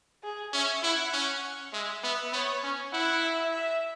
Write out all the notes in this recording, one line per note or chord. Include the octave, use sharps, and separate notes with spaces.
G#4
C#4 E5
E4 F#5
C#4
G#3 E5
B3 E5
B3 C#5
C#4
E4 F#5
E5
E5